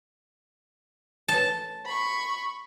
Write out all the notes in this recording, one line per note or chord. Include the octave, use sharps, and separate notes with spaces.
A5
B5 C#6